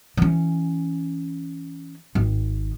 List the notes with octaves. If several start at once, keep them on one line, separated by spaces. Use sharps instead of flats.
E3 C#4
G#1